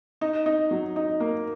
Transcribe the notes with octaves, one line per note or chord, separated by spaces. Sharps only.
D#4
D#4
F#3
D#4
A#3